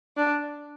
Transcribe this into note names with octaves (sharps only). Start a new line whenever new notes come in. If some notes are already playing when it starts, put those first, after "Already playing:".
D4